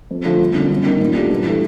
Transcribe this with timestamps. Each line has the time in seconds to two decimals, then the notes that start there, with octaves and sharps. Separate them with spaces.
0.11 F2
0.25 D3 F3 A3
0.40 G1
0.55 D3
0.60 F#2
0.71 G1
0.85 F#2 D#3
1.01 A#2
1.15 F#3 A3 D4 G4
1.30 G2
1.45 E3 A3